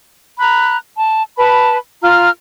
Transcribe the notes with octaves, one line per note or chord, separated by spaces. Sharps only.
A#5 B5 F#6
A5
B4 A5 B5
F4 A#5 F6